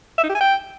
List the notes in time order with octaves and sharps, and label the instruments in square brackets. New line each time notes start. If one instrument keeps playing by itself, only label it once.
[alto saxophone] E5
D#4
G4
G#5
G5